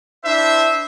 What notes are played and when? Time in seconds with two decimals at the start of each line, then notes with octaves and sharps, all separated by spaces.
0.24 D4 E4 C5 E5